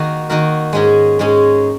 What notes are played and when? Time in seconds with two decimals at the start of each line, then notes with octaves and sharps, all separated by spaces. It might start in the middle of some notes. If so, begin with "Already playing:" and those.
Already playing: D#3 A#3 F#4 A#4
0.29 D#3 A#3 F#4 A#4
0.73 G#2 G#3 C#4 G#4
1.19 G#2 G#3 C#4 G#4